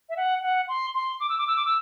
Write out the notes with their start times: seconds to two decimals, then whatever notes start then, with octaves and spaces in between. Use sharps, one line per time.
0.09 E5
0.17 F#5
0.43 F#5
0.68 C6
0.94 C6
1.20 D6
1.29 E6
1.38 D6
1.47 E6
1.56 D6
1.65 E6